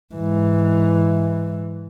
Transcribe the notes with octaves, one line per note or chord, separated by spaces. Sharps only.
G#2 E3